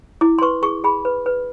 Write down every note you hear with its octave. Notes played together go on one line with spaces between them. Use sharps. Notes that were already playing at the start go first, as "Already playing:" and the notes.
E4 D6
C6
B4 C#6
G#4 C#6
G#4 B5
B4
B4